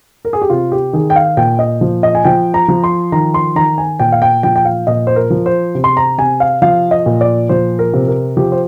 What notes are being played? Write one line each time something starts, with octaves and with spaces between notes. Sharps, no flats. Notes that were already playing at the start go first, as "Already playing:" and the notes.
A#4
G#4
G4
C3 F4
G4
D#3 G#4
G5
F5
A#2 G5
D#5
F3
D#5
G#5
F3 G5
A#5
F3
C6
D#3 A#5
C6
D#3 A#5
G#5
A#2 G5
F5
G5
F3 G5
G5
F5
A#2 D#5
C5
A#4
F3
C5
C3
C6
A#5
C3 G#5
F5
F3 F5
D#5
A#2
D5
F3 C5
A#4
C3
A#4
F3 G4
C5